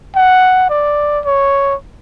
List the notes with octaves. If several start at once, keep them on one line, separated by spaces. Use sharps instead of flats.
F#5
D5
C#5